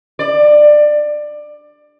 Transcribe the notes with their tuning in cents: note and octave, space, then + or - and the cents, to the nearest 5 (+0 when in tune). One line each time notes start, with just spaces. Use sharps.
D5 +20